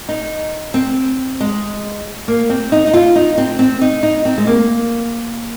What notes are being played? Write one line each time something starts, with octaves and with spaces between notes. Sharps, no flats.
D#4
C4
G#3
A#3
C4
D#4
D#4
F4
D#4
C4
C4
D#4
D#4
C4
G#3
A#3